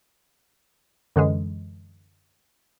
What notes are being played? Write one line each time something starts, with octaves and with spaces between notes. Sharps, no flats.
F#2 D3 E3 G#3